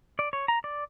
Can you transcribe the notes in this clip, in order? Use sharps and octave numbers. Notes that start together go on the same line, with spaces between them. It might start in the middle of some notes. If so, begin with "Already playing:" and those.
D5
C#5
A#5
D5